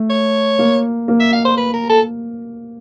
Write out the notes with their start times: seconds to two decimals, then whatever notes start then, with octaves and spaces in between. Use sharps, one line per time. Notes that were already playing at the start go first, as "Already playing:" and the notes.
Already playing: A3
0.10 C#5
0.59 A#3
1.08 A#3
1.20 E5
1.33 F5
1.45 C5
1.57 B4
1.74 A#4
1.89 A4